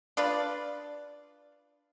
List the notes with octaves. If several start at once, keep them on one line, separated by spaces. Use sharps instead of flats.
D4 F4 B4 D5